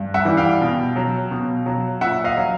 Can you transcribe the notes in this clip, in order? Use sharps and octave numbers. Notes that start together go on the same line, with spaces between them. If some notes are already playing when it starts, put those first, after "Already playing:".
Already playing: G2
E5 F#5
E3 G3
F5 G5
B2
F#3
B2
F#3
A#2 E5 F#5
D#5 F5
F#3